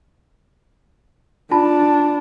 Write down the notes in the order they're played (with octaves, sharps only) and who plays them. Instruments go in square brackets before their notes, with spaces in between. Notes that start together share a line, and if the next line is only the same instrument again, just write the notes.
[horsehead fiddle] D4 [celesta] F4 A5 B5